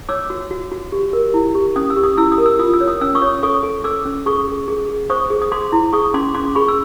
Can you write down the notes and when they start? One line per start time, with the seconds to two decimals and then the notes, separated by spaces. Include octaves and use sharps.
0.09 C#5 D6 E6
0.30 F#4
0.51 F#4
0.72 F#4
0.92 G4
1.13 A#4
1.34 E4
1.55 G4
1.76 C#4 D#6
1.90 E6
1.97 G4
2.03 D#6
2.17 E4 E6
2.32 D#6
2.38 A#4
2.46 E6
2.59 F4 D#6
2.74 E6
2.81 C#5
2.88 D#6
3.01 C#4 E6
3.15 C#6 D#6
3.22 C#5
3.43 A4 C#6 D#6
3.63 A4
3.84 A4 D6 E6
4.05 C#4
4.26 G#4 C#6 D#6
4.48 G#4
4.68 G#4
4.89 G#4
5.10 C5 C#6 D#6
5.30 G#4
5.42 D#6
5.52 G#4 C6 D6
5.72 E4
5.93 G#4 C#6 D#6
6.14 C#4 C6 D6
6.34 C#4 C6 D6
6.55 G#4 B5 C#6
6.68 E6